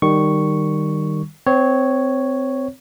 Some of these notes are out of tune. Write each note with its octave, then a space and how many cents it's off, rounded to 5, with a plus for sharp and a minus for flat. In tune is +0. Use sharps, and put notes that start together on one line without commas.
D#3 -15 G3 +0 C#6 +0
C4 -20 C#5 +0